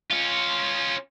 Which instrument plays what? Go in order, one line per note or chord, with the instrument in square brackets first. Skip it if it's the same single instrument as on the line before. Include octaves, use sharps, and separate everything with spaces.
[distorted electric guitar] C#4 F4